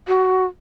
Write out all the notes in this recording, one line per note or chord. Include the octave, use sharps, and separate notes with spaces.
F#4